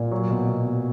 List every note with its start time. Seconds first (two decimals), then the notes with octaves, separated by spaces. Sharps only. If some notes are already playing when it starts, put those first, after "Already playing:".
Already playing: A#2
0.11 F#3
0.30 B2
0.48 B2
0.66 B2